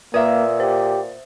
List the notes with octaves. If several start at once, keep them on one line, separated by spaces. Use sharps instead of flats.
A#2 A#3 B4 E5 D#6
G4 C5